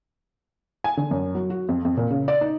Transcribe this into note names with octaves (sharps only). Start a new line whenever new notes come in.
G#5
D3
F#2
F#3
F#4
F2
F2
A#2
C#3
D5
D#4